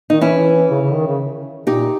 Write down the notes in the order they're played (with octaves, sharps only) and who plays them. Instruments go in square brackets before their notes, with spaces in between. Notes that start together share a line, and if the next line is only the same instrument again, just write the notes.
[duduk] D#3 [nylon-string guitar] D#4
[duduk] E3 [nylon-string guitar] C#4 E4
[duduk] C#3
C#3
D#3
C#3
[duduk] A#2 [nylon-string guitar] D#4 G4